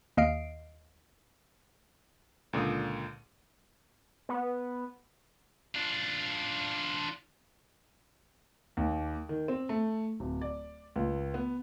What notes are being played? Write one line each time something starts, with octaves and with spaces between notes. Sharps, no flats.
D#2 D#5 F5 C7 D7
C#2 A#2 D3 D#6
B3
D4 F4
D#2
D#3
C4
A3
D1
D5
C#2
B3